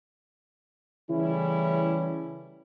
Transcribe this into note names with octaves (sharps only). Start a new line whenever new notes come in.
C#3 E3 G3 A3 C#4 E4